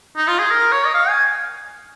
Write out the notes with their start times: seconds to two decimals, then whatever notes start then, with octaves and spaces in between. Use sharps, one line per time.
0.17 D#4
0.28 F4
0.39 G#4
0.50 A#4
0.72 C#5
0.86 D#5
0.94 F5
1.09 G#5